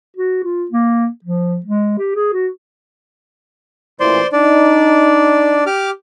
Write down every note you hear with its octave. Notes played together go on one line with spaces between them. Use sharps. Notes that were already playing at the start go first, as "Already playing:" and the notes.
F#4
F4
A#3
F3
G#3
G4
G#4
F#4
A1 A#2 E3 C5 D5 C6
D4 D#4 D5
G4 D6 F6